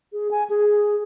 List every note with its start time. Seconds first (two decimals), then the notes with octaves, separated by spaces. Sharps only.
0.13 G#4
0.31 G#5
0.50 G#4